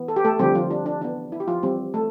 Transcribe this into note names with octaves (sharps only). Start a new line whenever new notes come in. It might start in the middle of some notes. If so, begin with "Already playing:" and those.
Already playing: E3 B3
A4
G4
A3 A4
D3 F3 G3 C4 G4
F3 F4
D4
D4
E3 B3 D4
E4
G4
F3 F4
E3 G3 C4 G4
A3 A4